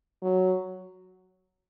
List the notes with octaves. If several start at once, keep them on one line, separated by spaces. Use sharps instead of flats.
F#3